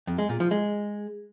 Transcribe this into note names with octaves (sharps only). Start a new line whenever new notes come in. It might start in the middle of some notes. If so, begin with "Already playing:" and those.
F2
G#3
A#2
F3
G#3